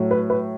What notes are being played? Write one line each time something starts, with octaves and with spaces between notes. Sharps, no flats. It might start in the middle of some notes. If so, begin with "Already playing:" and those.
Already playing: A2 F#3
B4
B4